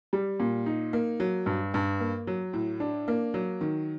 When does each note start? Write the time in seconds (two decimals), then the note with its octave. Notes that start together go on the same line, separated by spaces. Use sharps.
0.13 G3
0.40 A#2
0.66 D#4
0.93 A#3
1.20 F#3
1.46 G2
1.74 G2
2.00 A#3
2.27 F#3
2.53 A2
2.80 D4
3.08 A#3
3.34 F#3
3.61 D#3